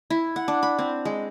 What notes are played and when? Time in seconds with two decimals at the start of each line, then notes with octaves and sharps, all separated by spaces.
0.10 E4
0.36 F#5
0.48 D4
0.63 B5
0.79 C4
1.05 G#3